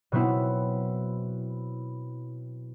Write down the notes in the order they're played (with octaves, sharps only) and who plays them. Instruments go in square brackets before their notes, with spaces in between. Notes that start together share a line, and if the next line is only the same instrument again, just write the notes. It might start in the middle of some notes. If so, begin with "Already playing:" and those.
[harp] B2 F#3 B3 C4 E4